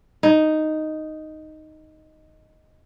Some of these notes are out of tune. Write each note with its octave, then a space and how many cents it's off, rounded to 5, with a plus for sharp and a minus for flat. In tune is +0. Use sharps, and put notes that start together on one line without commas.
D#4 +0